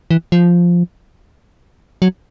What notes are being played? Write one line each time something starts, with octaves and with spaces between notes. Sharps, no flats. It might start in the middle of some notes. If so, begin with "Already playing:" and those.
E3
F3
F#3